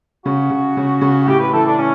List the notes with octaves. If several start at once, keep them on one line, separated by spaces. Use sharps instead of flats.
C#3 F#4
C#3
C#3
C#3
A2 G4
B4
E3 A4
D4
A2 C#4